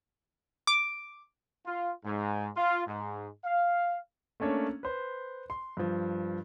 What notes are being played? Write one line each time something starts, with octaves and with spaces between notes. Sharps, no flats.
D6
F4
G#2
F4
G#2
F5
A3 A#3 C#4 D4 C#5
B4 C5
C6
G2 F3